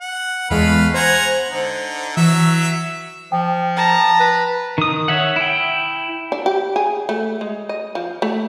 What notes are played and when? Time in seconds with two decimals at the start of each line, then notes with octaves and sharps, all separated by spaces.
0.01 F#5
0.50 E2 G#3 A3 B4 F5
0.94 C5 F#5 G#5 A#5
1.50 D3 D#4
2.17 E3 F#3 E5
3.32 F3 G5
3.76 A5 A#5
4.20 B4
4.78 D#3 D#6
5.08 C#5 E5 F#5
5.36 E4 G5
6.32 D4
6.46 G4
6.76 G#4
7.09 A3
7.41 G#3
7.69 D#5
7.95 F3
8.22 A3